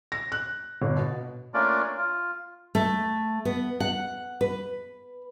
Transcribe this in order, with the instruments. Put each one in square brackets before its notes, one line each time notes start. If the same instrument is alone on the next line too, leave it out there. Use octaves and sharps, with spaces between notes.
[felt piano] A#6
F#6
G1
B2
[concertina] A3 A#3 C#4 D4 F4 D5
F4
[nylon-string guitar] A3
B3
F#5
B4